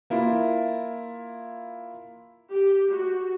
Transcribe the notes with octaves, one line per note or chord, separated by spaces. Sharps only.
A#3 E4 F4
G4
F#4